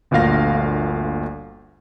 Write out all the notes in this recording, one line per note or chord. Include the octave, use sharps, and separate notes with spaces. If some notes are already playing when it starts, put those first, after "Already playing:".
G1 D2 A#2 F5 A#6